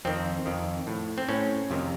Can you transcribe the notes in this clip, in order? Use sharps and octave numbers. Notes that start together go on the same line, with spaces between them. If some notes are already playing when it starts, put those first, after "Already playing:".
F2 D#3 C4
F2 D#3
A2
C4
A2 C#4
F2 C3 D#3